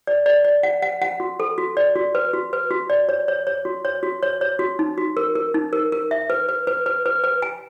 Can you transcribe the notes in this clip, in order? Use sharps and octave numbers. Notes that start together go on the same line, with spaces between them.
D5
D5
D5
F#5
F#5
F#5
F#4
A4
F#4
D5
F#4
B4
F#4
B4
F#4
D5
C#5
C#5
C#5
F#4
C#5
F#4
C#5
C#5
F#4
D#4
F#4
A#4
A#4
D#4
A#4
A#4
E5
B4
B4
B4
B4
B4
B4
G#5